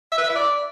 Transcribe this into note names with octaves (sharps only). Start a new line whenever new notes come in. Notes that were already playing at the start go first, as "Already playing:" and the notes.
E5
B4
E5
E4
D5